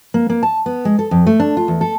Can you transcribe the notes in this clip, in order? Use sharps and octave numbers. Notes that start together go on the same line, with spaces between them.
A#3
A#3
A5
B3
G#3
A4
F2
A3
D4
F4
E2
A4